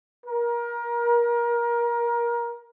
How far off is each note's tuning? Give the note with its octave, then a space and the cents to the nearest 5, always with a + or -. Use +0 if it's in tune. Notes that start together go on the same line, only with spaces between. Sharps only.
A#4 +25